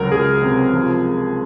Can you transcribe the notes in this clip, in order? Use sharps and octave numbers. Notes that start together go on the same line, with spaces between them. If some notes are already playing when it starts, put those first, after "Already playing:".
Already playing: C#2 F#3 A#4
C#2 G#4
C3
F3